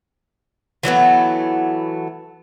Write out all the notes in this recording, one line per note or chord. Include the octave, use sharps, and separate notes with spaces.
E3 F#3 A3 B3